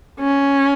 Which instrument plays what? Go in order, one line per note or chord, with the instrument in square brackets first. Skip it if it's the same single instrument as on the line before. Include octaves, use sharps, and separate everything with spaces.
[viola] C#4